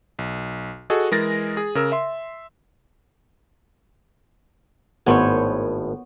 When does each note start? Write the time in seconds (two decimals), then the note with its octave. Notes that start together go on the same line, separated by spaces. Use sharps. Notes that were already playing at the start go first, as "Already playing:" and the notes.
0.19 B1
0.90 F#4 G#4 A4 D#5
1.11 E3 G#3 G#4 A#4 A6 A#6
1.57 G#4
1.75 C#3 A#4 E6
1.92 E5 C6
5.06 G#1 A2 B3 C5 C#5 G#5